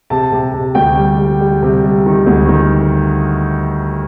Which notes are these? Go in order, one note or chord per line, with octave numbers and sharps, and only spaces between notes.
C3 A5
C3
C3
D2 G5
G3
G3
G3
C3
G3
D#3
D2
D#3